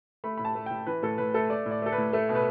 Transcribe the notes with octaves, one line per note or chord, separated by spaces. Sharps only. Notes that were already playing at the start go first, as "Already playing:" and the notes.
A3 B5
A2 B5
A5
A3
A2 G5
E3 B4
A2 A4
A2 B4
A3 A4
A3 D5
A2
D5
A3 A4
B4
A2
A3 A4
B2
B4